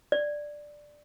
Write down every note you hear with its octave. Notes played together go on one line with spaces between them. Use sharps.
D5